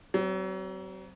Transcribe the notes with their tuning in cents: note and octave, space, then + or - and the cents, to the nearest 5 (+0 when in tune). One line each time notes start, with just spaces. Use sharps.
F#3 +40 C4 -10